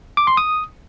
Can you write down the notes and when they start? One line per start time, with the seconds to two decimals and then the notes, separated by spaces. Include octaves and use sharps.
0.17 D6
0.27 C6
0.37 D#6